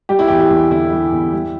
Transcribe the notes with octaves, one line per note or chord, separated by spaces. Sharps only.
G3 G4
E4
E2 G4
G4
E2
D3 E4
G3
E2
G3